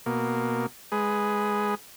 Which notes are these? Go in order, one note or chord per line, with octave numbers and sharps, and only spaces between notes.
B2 A#3
G#3 G#4 B4